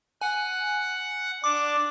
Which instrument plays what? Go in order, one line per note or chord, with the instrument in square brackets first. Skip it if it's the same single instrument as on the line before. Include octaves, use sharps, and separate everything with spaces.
[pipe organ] F#5 [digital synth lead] G#5
[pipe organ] D4 [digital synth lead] D6